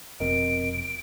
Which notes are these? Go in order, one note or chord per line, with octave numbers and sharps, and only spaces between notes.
F1 F2 B2 C4 A#4 D#5 D7